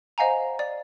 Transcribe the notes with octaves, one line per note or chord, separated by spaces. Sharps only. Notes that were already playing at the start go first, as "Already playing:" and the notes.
C5 D#5 F5 F#5 G#5 A#5
D5